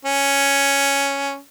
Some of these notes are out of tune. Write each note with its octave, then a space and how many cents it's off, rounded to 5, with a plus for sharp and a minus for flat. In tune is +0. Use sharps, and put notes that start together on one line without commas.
C#4 +5